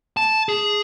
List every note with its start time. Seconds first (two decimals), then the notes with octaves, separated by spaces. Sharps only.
0.17 A5
0.49 G#4